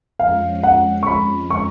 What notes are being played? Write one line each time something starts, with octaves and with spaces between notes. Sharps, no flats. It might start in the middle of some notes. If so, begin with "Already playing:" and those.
F2 F3 G#3 C#4 F5
F#5
C#6
B5
C#6